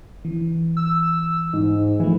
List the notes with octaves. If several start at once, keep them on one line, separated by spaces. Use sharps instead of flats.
E3
E6
G#2
E3 F3 A3